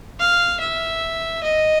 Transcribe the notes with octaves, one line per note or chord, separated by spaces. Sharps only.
F5
E5
D#5